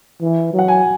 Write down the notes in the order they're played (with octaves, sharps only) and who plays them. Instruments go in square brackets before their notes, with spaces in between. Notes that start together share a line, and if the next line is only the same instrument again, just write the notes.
[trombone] E3
F#3
[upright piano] F#5
G#5